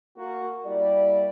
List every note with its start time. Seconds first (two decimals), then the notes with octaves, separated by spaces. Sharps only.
0.17 A#3 F#4 A#4
0.65 G3 A#3 E4 G4 D5